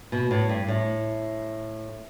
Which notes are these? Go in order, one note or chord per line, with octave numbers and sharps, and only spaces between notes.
B2
A2
G2
A2